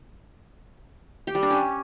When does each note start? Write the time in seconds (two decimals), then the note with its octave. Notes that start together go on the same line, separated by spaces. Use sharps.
1.27 G4
1.35 G3
1.43 D4
1.50 C#4